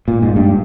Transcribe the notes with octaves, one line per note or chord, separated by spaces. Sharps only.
A#2
G#2
G2